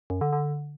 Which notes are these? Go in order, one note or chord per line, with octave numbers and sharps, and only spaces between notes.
F#2
D3
D3